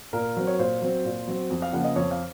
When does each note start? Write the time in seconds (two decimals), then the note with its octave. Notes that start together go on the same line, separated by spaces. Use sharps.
0.13 A#2 A#4
0.37 F#3 C4
0.47 C#5
0.59 A#2 C5
0.82 F#3 C4
1.05 A#2
1.28 F#3 C4
1.50 F2
1.62 F5
1.73 C#3 F3 A#3 F#5
1.84 D#5
1.96 F2 C#5
2.11 F5